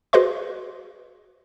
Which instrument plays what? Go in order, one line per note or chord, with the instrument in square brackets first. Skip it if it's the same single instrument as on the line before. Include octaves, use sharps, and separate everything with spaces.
[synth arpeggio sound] F#4 G#4 B4 C5 D#5 C6